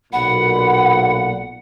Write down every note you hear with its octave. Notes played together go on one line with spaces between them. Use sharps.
B1 A#2 F#5 B5